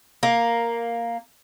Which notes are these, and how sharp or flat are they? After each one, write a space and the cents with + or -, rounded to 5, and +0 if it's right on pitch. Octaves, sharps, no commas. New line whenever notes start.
A#3 +0